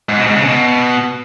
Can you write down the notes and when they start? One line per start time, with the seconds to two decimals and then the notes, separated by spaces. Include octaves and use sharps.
0.09 G#2
0.18 B2
0.27 G#2
0.36 C#3
0.45 B2